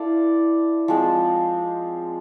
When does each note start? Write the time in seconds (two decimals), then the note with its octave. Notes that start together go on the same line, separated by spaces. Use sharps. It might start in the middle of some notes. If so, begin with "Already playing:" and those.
Already playing: E4 A4 D5 F5
0.88 F3 G#3 C4